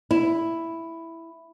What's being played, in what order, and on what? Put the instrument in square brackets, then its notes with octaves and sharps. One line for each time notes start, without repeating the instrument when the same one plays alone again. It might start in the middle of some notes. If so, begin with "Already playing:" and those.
[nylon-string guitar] E4